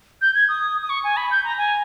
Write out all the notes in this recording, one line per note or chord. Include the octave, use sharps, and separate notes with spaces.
G6
G#6
D#6
D#6
C#6
G#5
B5
G6
A#5
G#5